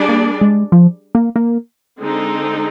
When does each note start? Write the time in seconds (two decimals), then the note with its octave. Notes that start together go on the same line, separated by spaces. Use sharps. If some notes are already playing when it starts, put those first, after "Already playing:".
Already playing: G3 D4 G#4 D5
0.09 A#3
0.41 G#3
0.72 F3
1.15 A#3
1.36 A#3
1.99 D3 G#3 C4 D#4